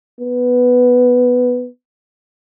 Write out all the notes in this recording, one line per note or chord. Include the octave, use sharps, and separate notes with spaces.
B3